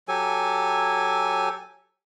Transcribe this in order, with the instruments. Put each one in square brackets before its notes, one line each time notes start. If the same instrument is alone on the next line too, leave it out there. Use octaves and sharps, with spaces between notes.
[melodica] F#3 G4 A4 G#5